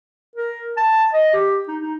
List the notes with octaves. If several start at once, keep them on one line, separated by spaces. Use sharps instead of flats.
A#4
A5
D#5
G4
D#4
D#4